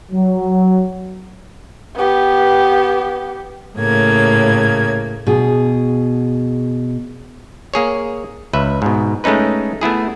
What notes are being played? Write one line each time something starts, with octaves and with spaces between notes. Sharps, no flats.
F#3
B3 G4
A2 C#3 A#3 G#6
B2 G#4
A#3 G#4 C#5
C#2 B4 E5
G#2 B2
G#3 A3 C#4 D#4 B4
A3 B3 E4 G#4